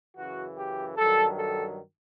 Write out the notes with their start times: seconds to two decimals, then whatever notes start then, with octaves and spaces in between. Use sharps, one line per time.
0.16 F#2 C#3 E3 F#4
0.57 G4
0.97 G2 D#3 F#3 A4
1.38 A4